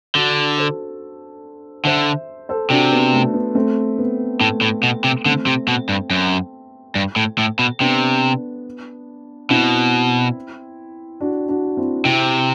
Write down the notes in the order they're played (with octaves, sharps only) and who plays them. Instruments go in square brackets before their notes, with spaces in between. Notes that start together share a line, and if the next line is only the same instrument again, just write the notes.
[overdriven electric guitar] D3 [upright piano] D4 F#4
[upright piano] A4 C5
[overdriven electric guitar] D3 [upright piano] C5 E5
[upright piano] A4 C5
[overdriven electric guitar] C3 [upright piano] D4 F#4
[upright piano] B3
A3
B3
A3 C4
B3
[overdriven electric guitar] A2 [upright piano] A3
[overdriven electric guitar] A2
B2
C3
[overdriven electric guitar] D3 [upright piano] A3 C4
[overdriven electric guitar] C3
B2
G2
F#2
G2
A2
A2
B2
[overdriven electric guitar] C3 [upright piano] B3 D4
[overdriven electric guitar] B2 [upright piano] C4 E4
[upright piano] D4 F#4
D4 F#4
C4 E4
[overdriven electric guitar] C3 [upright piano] C4 E4